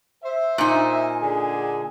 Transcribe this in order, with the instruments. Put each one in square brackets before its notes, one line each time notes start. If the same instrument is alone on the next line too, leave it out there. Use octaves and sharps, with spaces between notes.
[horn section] C5 E5
[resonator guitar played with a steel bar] A#2 D#4 [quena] G#5
[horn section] D3 G#4